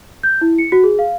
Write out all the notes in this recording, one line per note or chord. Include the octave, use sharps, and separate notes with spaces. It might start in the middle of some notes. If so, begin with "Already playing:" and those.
G6
E4
C#7
F#4
G#4
F5